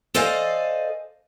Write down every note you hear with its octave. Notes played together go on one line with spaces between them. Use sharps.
A4 C5 D5 D#5 F5 G#5